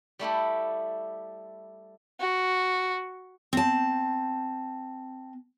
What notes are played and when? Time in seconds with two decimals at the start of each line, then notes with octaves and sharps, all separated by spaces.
0.19 G3 A3 E4 G4
2.20 F#4
3.53 C4 A5